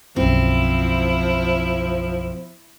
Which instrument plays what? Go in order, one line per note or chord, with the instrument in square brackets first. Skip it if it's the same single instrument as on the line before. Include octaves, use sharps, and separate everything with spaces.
[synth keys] B1 F#2 [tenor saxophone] F3 [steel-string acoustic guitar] C4 [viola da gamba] E4